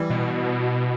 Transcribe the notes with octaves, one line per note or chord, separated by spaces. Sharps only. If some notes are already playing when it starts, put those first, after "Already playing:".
Already playing: E3 G3
B2